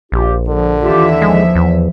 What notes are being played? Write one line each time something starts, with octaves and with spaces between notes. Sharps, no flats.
A#1 F4 G4
D3 F3
D#2 E3 F4 G4 E5
F3 G#3
E2